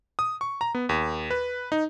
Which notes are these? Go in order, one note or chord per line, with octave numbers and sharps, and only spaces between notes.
D#6
C#6
A#5
B3
D#2
B4
D#4